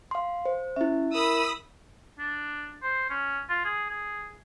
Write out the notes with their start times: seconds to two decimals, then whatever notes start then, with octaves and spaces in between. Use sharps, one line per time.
0.11 F5 C6
0.45 C5
0.76 C#4 E4 E5
1.15 A#4 B5 D#6 E6
2.19 D4
2.83 C5
3.10 C#4
3.49 F4
3.65 G#4
3.90 G#4